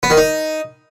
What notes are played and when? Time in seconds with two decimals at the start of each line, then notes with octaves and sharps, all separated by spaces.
0.03 B3
0.10 D#3
0.17 D#4